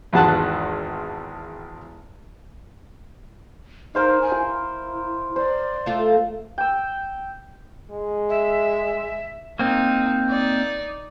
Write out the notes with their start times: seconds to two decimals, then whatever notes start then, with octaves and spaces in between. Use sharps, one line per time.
0.13 G#1 E2 G#3 F#5 A5 F#6
3.95 D#4 A#4 C5 F5
4.22 G#5
4.36 E4
5.36 C5 D5
5.86 A3 F4
6.58 G5 E6
7.91 G#3
8.30 E5
9.59 A#3 C4 D#4
10.29 D#4 D5